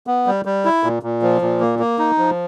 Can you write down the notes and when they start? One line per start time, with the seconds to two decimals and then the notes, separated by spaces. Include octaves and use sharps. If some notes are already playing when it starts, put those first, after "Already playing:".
0.07 B3
0.27 G3
0.45 G3
0.65 E4
0.83 A#2
1.03 A#2
1.22 F3
1.41 A#2
1.60 A#3
1.79 A#3
1.99 D#4
2.18 F3